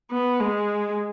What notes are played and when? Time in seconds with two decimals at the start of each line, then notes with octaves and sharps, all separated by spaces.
0.11 B3
0.40 G#3